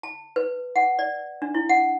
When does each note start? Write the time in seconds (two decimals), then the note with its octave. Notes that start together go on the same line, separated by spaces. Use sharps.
0.03 A5
0.36 B4
0.76 F#5
0.99 D5
1.42 D4
1.55 E4
1.69 F#5